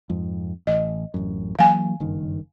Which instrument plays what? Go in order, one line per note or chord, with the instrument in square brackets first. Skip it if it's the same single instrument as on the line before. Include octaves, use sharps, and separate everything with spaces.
[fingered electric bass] F2 G#2
[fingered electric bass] A1 [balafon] D#5
[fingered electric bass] D1 A1 F#2
[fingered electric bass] E3 F#3 A#3 [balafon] F5 G#5
[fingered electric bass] F#1 G2 D#3